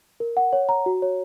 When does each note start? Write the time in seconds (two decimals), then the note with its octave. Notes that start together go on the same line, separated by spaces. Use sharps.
0.20 A#4
0.37 F#5
0.53 C#5
0.69 A#5
0.86 F#4
1.02 C#5